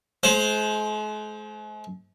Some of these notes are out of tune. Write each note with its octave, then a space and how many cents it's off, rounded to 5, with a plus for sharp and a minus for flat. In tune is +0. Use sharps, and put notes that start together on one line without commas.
G#3 +45 C5 +0